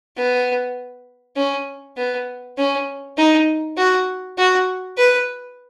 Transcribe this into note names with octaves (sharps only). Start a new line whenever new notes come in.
B3
C#4
B3
C#4
D#4
F#4
F#4
B4